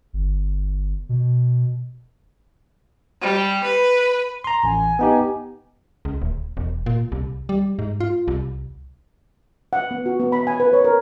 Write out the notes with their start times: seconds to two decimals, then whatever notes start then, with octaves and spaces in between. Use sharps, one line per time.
0.13 G1
1.09 B2
3.21 G3
3.64 B4
4.44 A#5 C6
4.64 A1 G#5
4.99 B3 D#4 G4
6.05 C#2
6.22 D1
6.57 E1
6.86 A#2
7.12 C2
7.49 G3
7.79 G#2
8.00 F4
8.28 C2
9.73 F#5
9.91 B3
10.06 F#4
10.20 B3
10.32 B5
10.47 G#5
10.60 B4
10.73 C#5
10.84 A#4